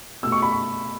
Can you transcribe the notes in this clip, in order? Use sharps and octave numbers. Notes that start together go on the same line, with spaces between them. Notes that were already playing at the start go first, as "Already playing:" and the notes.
B2 A3 E6
C#6
B5
C#6